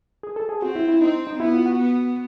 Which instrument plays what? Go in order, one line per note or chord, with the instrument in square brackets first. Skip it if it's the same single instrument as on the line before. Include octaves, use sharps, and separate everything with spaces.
[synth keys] G#4
A4
G#4
[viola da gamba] C4 [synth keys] F#4
[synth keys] E4
E4
[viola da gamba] C4 [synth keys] D#4
[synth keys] D#4
[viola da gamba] B3 [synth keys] E4
[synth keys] F4
F#4
[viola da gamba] B3